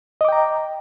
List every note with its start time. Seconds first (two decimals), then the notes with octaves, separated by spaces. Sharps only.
0.21 D#5
0.25 D6
0.29 G5
0.32 A#5